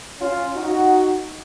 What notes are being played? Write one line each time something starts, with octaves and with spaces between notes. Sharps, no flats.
C#4 F4
D#4 F#4